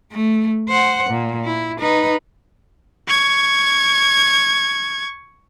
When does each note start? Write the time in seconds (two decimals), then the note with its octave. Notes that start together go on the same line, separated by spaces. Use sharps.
0.12 A3
0.69 C5 F#5
1.10 A#2
1.44 E4
1.80 D#4 B4
3.07 C#6 G#6